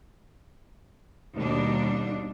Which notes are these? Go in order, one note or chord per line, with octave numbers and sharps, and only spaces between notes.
D#2 B2 G3 D4